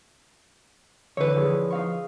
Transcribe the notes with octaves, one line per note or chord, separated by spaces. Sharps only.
D3 E3 B4 C#5
F3 E4 G#4
D#4 F5 C#6